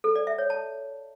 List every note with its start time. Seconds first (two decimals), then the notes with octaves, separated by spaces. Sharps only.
0.04 A4
0.16 D5
0.27 E5
0.38 C#5
0.50 A5